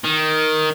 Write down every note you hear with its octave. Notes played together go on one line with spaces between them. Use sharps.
D#3